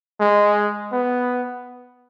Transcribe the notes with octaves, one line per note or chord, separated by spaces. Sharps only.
G#3
B3